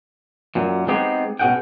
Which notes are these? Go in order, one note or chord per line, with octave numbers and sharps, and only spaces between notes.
F#2 A#2
G#3 B3 C4 D#4 G4 G#4
B2 C#4 G#4 F#5 G5